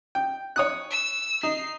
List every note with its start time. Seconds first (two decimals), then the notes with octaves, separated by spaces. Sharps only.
0.15 G5
0.56 C#5 D#6 F#6
0.90 E6
1.43 D#4 C7